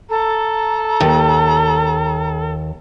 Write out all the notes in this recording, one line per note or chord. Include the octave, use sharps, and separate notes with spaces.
A4 A#5
D#2